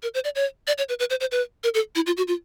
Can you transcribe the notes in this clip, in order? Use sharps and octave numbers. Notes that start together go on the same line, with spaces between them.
A#4
C5
D5
C#5
D5
C#5
B4
B4
C5
C5
B4
A#4
A4
E4
F4
F#4
F4